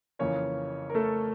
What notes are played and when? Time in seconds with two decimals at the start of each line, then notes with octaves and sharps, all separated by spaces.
0.19 F2 C#3 E3 A#3 C#4 C#5
0.90 A#4
0.95 A3 A4